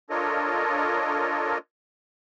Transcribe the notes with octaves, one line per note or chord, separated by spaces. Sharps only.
D4 F4 A4 A#4 C#5 D#5